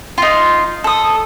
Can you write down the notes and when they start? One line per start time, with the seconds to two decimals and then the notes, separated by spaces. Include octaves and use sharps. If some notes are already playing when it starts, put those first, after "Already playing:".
0.18 D#4 F4
0.84 A4 D#6